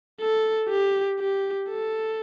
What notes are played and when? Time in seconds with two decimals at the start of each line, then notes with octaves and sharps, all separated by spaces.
0.21 A4
0.70 G4
1.19 G4
1.69 A4